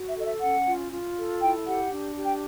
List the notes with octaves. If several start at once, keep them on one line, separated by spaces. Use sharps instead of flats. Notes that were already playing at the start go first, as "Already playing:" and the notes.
Already playing: F#4
E5
A4 D#5
E5
C#4 F#5
F4
F4
A4
E4 G5
G4 F#5
D4
G4
G5